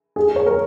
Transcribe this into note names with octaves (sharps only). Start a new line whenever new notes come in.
G#4
G#4
C#5
A#4